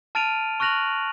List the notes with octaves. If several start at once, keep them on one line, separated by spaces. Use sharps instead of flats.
A5 F6 A6 D7 D#7 F7
C#6 F6 F#6 A#6 F7 F#7